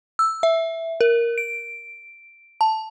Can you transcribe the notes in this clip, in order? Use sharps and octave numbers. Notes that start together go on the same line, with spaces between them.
E6
E5
A#4
D7
A5